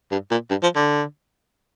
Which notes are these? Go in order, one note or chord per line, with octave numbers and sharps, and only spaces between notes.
G2
A#2
G2
F3
D3